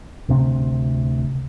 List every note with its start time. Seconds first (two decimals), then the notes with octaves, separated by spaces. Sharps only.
0.29 D1 D2 C3 C4